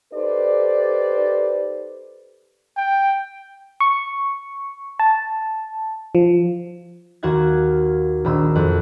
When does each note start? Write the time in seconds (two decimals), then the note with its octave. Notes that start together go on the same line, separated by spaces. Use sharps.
0.13 D#4 G4 A4 B4 C5 D5
2.77 G5
3.80 C#6
4.99 A5
6.15 F3
7.23 D#2 F#4 F5 F#5 G#6
8.24 A#1 D#3 B5 E6
8.55 F2 F#6